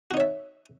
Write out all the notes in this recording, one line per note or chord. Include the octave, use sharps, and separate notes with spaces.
D#4 F#4 C#5 E5